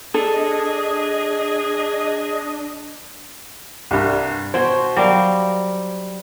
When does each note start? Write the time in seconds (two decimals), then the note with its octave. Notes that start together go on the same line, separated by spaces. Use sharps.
0.14 D4 G#4 A4 D#5
3.91 C2 G2
4.54 B2 F#4 C5 G5 C6 G#6
4.97 F#3 G3 F#4 A#4 F5